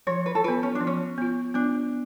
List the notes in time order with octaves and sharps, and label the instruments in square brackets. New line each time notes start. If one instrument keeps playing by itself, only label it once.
[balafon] F3 [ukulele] C#5
[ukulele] B4
A4
[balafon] B3 F4 [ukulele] B4
[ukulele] C#4
D4
[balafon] F3
[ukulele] C#4
[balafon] B3 F4
[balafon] B3 [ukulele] D4